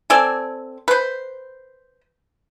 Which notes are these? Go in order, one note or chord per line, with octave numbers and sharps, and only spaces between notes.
C4 A4 D5 G#5
B4 C5